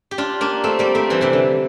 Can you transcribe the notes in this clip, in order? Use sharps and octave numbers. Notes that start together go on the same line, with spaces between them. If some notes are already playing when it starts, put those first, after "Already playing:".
G4
D4 F4
A#3 D4
A3 C4
G3 A#3
A3 C4
E3 G3
C3 E3
D3